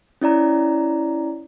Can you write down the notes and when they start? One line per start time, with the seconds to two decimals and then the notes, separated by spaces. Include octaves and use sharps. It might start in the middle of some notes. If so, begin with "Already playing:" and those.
0.21 C#4 E4 D5 A#5